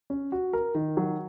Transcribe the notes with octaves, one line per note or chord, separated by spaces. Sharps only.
C#4
F#4
A#4
D#3
F#3